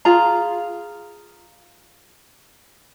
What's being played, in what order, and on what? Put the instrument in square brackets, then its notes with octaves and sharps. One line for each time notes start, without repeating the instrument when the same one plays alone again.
[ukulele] F4 G#4 A#5